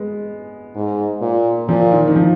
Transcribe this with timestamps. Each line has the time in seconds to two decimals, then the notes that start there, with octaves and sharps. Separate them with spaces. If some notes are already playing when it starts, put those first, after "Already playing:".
Already playing: G#3 B3
0.75 G#2
1.21 A#2
1.68 A#2 F3
1.91 D#3
2.08 D#3
2.16 F3